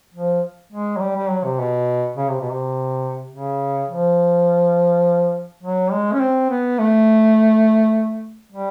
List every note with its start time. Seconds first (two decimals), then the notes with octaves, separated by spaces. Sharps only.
0.14 F3
0.72 G#3
0.97 F#3
1.01 G3
1.16 G3
1.30 F#3
1.44 C3
1.60 B2
2.17 C#3
2.29 C3
2.41 B2
2.52 C3
3.33 C#3
3.90 F3
5.63 F#3
5.92 G#3
6.13 C#4
6.20 C4
6.50 B3
6.79 A3
8.52 G3